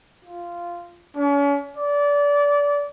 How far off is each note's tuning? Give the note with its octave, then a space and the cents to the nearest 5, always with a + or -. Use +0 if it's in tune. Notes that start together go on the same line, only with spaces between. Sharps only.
F4 -10
C#4 +40
D5 -25